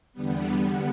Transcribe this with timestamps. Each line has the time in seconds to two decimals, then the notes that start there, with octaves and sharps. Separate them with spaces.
0.13 E2 D3 G3 B3